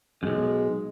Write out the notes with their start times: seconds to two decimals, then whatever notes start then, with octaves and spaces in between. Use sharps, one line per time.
0.23 B1 F#2 G#3